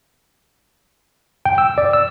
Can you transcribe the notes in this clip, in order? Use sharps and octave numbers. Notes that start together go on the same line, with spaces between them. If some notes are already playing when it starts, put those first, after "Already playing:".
G5
E6
D5
E6